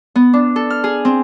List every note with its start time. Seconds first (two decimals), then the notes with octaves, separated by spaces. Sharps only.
0.15 B3
0.34 D4
0.56 A4
0.70 F6
0.84 G#4
1.05 C4